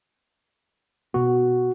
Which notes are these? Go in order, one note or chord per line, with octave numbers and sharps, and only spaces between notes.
B2 B3 F#4